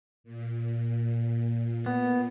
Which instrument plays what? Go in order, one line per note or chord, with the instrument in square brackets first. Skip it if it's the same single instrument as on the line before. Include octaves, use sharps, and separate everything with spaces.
[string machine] A#2
[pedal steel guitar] B3